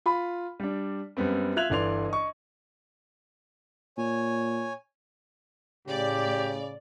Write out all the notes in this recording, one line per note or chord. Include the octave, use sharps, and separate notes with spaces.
F4 B5
G3 D4
F#2 G3 B3 C4
F4 E5 F#6 G#6 F7 F#7
G1 E3 D5 C6 F7
D#5 C#6
A#2 C#5 G#5
A2 C#3 G4 D5